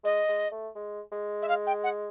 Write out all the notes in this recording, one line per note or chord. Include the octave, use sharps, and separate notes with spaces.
G#3 D#5
G#3
A3
G#3
G#3
E5
F5
G5
F#5